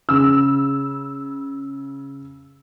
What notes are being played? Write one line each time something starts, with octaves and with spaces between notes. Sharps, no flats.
C#3 E6